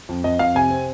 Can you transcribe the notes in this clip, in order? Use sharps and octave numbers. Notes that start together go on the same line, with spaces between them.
F2
F2 D#5
F2 F5
C3 G#5
C4